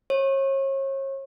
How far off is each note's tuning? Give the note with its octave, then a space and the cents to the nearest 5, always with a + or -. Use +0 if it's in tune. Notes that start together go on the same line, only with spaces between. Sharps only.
C#5 -35